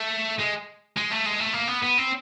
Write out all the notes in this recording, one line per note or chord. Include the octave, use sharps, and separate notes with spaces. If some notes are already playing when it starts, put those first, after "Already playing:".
Already playing: A3
G#3
G#3
A3
G#3
A3
A#3
B3
B3
C4